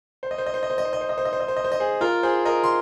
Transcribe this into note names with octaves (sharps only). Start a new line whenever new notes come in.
C5
D#5
C5
D#5
C5
D#5
C5
D#5
C5
D#5
C5
D#5
C5
D#5
C5
D#5
C5
D#5
C5
D#5
G#4 C5
F4 A#4
G#4 C5
A#4 D#5
C6